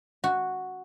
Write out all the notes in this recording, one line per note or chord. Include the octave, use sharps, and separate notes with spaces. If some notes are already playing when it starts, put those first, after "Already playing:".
F#4